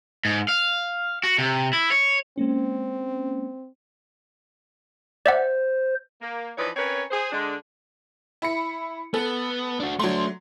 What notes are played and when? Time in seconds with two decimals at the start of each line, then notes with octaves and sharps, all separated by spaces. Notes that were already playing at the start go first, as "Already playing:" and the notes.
0.25 G#2
0.49 F5
1.24 F#4
1.38 C3
1.73 E4
1.91 C#5
2.38 G#3 A#3 C4 C#4
5.26 C5 D5 E5 F#5
6.21 A#3
6.57 E3 F3 D#4 B4 C#5 D5
6.76 C4 C#4 A#4 B4 C#5
7.10 G#4 C5
7.31 D3 G#3 D4
8.42 E4 B5 C#7
9.14 B3 A4
9.80 D4 F#4
10.00 F#3 A3 D4 C6